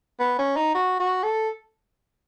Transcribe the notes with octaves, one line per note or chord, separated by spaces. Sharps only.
B3
C#4
D#4
F#4
F#4
A4